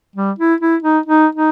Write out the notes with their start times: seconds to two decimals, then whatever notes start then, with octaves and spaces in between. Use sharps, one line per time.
0.15 G3
0.38 E4
0.60 E4
0.82 D#4
1.06 D#4
1.35 D#4